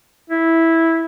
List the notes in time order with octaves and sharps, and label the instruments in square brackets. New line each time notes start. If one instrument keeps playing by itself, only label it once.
[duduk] E4